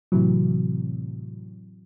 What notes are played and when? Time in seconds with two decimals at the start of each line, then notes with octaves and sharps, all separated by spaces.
0.12 A2 C3 E3 F#3